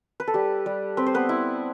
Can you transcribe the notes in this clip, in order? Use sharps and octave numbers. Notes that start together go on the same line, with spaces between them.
B4
A4
G3 G4
G3
C4 B4
C5
B3 B4
E4